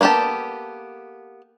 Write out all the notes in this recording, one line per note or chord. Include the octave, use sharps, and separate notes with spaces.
A#3 B3 G4 A4 A5